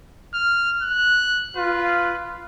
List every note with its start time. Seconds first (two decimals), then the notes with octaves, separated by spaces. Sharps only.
0.34 F6
0.82 F#6
1.57 F4 B4